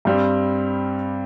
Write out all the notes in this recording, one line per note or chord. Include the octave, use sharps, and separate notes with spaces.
G2 G3 C4